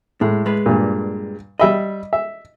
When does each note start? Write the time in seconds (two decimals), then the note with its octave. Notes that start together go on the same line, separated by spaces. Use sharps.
0.21 A2 G#3
0.46 G#3 B4
0.66 G2 A#2
1.60 G3 D#5 E5 B5
2.13 E5